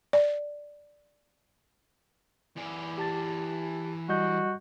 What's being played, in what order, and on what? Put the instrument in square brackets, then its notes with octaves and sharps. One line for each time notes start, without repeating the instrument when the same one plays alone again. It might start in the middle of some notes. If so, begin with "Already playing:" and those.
[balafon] D5
[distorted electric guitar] E3 D5
[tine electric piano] G4 A5 A6
[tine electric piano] G3 D#5 G6 [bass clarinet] F#4